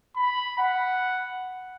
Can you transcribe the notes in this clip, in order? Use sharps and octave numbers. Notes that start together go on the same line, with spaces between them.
B5
F#5